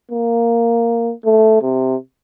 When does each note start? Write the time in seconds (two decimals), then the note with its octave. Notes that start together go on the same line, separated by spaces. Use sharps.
0.12 A#3
1.25 A3
1.62 C3